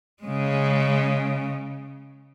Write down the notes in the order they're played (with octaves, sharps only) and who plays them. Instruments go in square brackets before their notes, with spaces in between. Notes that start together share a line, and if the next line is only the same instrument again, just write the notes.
[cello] C#3 G#3